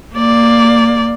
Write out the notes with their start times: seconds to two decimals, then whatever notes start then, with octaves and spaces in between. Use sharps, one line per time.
0.15 A#3 D5